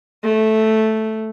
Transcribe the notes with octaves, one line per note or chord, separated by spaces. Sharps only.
A3